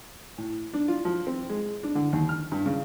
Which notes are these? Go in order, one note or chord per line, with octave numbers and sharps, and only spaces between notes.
A2
D4
F4
F3
C4
G#3
D4
D3
D#2
F6
G2
C#3